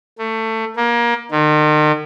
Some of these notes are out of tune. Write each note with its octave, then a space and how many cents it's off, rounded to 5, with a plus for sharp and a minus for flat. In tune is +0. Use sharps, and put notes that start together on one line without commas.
A3 +20
A#3 +25
D#3 -40